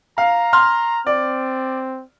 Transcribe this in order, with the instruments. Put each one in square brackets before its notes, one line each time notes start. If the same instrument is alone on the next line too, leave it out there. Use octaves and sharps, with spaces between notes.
[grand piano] F5 [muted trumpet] A#5
[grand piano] C6 F6
[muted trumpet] C4 [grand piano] D5